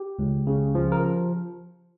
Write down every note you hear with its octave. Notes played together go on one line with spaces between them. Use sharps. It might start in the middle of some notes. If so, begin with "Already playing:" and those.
Already playing: G4
C#2
C#3
F3
A#4